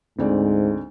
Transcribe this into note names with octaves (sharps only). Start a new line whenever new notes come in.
D2 G#2 C4 D5